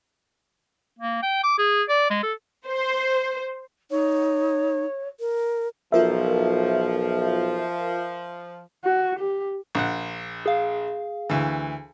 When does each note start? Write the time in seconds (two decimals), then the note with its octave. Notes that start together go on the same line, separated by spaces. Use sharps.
0.99 A#3
1.23 G5
1.43 D6
1.58 G#4
1.89 D5
2.10 G#3
2.23 A4
2.67 C5
3.91 D#4 C#5
5.20 A#4
5.92 B1 F3 F4 A#4 E5
8.84 F#4
9.20 G4
9.75 A#1 F#5
10.46 G#4 F5
11.30 D2 E3